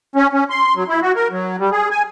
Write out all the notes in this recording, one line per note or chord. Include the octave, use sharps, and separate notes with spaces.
C#4
C#4
C6
F#3
E4
F#4
A#4
F#3
G3
G#4
G#5